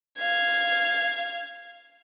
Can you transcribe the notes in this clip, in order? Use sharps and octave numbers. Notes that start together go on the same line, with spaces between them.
F5 G#6